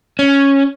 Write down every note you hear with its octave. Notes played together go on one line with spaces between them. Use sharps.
C#4